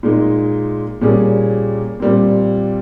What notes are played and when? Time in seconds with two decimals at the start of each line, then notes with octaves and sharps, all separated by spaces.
0.03 A#2 G#3 D#4
1.01 A#2 G3 C#4 G#4
2.00 A#2 G3 C4